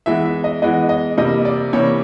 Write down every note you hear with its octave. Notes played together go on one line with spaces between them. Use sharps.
E3 G#3 B3 E5
E5
D#5
E3 G#3 B3 D#5
D#5
C3 E3 G3 A#3 D#5
D5
C3 E3 G3 A#3 C#5